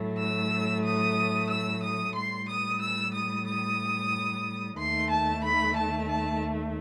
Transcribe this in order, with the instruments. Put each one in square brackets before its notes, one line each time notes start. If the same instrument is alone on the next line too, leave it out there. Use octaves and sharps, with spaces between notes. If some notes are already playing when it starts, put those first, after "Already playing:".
Already playing: [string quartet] A2 F#3 A3
E6
D#6
E6
D#6
A2 G3 C6
D#6
E6
D#6
D#6
D#2 D#3 A3 C6
A5
B5
A5
A5